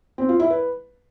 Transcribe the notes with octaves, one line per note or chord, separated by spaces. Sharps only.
C4
F4
E4
B4